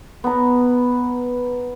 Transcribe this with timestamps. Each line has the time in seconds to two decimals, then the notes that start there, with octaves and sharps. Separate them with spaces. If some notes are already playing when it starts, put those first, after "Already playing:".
0.24 B3 A#5